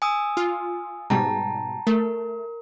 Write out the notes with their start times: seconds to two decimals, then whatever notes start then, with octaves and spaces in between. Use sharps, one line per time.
0.02 G#5 D#6 E6
0.37 F4
1.10 G#2 B2 G3 G5 A5 A#5
1.87 A3 A#4